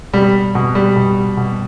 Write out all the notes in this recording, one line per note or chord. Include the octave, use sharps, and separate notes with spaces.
B2 G3
B2
G3
B2
B2